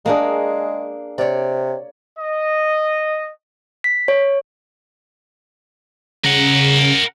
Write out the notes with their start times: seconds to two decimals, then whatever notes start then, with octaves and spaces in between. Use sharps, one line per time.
0.06 G#3 A#3 D4 G#4
1.18 C3 C#5 D5
2.19 D#5
3.84 B6
4.08 C#5
6.25 C#3 A#4 F#5